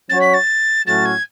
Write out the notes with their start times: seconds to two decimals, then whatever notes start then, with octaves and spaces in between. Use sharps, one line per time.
0.09 F#3 C#4 F#4 C#5 A6
0.21 B6
0.34 A6
0.86 A2 F#3 A3 C#4 F#4 A6
1.05 G#6